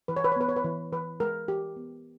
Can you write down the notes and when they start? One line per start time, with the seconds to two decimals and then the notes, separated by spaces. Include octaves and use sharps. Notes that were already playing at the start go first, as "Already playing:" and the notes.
0.08 E3 B4
0.16 C#5
0.24 B4
0.32 C#5
0.36 B3 B4
0.49 C#5
0.56 B4
0.64 E3
0.92 E3 B4
1.20 G#3 A#4
1.48 E3 G4
1.76 B3